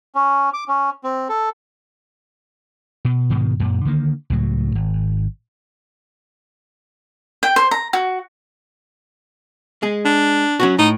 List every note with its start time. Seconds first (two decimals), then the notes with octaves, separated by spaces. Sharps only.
0.15 C#4
0.54 D6
0.68 C#4
1.04 C4
1.29 A4
3.05 B2
3.30 G#2 B2 D#3 G#3
3.60 F#2 A#2
3.85 D3 D#3 A#3
4.30 C#2 A2 F#3
4.75 G#1
7.43 G5
7.56 C5
7.71 A#5
7.93 F#4
9.83 G#3 G#4
10.05 D4
10.60 F#3 C#4 F#4
10.79 A2 D#4